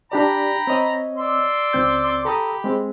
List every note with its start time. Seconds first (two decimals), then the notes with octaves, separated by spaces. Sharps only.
0.12 D4 G4 D5 G5 A#5 B5
0.67 C4 C#5 D#5
1.17 D5 C6 E6
1.73 C#2 C4 G6
2.25 G4 A4 A#5 B5 D#6
2.64 G#3 C4